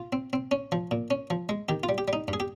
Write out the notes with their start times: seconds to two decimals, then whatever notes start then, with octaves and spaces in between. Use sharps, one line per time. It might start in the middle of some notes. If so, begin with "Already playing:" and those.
Already playing: F4
0.13 C4
0.33 C4
0.51 C#4
0.72 F3
0.91 A#2
1.11 C#4
1.30 F3
1.49 G#3
1.69 D#3 G4
1.83 F4
1.89 G3
1.98 G4
2.08 G3
2.13 D#4
2.28 G2
2.33 G#4
2.40 G4